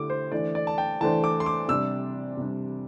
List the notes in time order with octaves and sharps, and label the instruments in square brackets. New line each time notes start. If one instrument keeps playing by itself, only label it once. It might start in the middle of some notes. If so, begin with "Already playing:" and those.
Already playing: [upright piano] D3 A3 E4 G4 [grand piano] D6
[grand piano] C5
[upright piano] E3 A3 D4 C5 [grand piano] D5
[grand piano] D5
A5
G5
[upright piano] E3 A3 D4 C5 [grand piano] A5
[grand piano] D6
C6
D6
[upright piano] C3 G3 D4 [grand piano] E6
[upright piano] C3 G3 D4